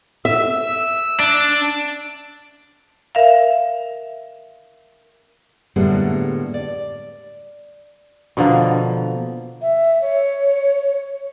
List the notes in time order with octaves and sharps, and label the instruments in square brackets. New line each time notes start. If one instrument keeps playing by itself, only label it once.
[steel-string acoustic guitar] E5 [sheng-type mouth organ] E6
[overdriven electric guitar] D4
[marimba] A#4 E5 F5
[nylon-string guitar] A2 D3 G3 G#3 A#3 B3
D5
[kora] B2 D3 F3 A#3
[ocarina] E5
C#5